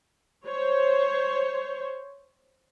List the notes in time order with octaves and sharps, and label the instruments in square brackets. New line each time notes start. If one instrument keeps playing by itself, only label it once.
[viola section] C5 C#5